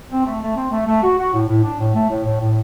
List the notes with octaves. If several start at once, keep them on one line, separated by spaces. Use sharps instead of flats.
C4
A3
A3
C4
A3
A3
F#4
F#4
A2
A2
D4
A2
A3
A2
A2
A2